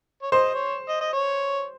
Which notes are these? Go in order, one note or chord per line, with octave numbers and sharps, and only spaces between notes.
C#5
C5 D#5
C#5
D#5
D#5
C#5